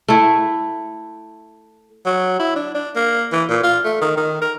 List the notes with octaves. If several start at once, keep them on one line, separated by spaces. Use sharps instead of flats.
A3 E4
F#3
E4
D4
D4
A#3
E3
A#2
F4
A3
D#3
D#3
A#4